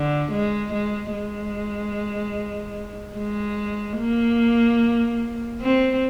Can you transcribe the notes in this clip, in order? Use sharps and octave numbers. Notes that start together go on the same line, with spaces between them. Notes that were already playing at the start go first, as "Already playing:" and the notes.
Already playing: D3
G#3
G#3
G#3
G#3
A#3
C4